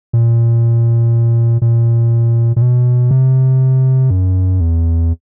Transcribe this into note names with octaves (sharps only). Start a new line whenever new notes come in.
A#2
A#2
A#2
B2
C3
F#2
E2